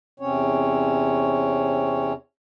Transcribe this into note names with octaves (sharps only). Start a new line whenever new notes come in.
E2 C3 C4 C#4 C#5